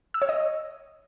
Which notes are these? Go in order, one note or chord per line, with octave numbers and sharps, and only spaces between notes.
E6
C#5
D#5